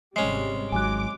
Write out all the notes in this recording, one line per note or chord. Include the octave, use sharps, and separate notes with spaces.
G#1 C3 G3 G#3 C#4 C7
G#1 G#2 F#3 G#5 D6 F#6